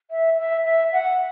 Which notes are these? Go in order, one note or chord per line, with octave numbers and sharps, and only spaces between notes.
E5
E5
E5
F#5